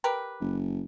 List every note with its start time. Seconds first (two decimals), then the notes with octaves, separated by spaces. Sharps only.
0.04 G4 A#4 B4
0.41 F#1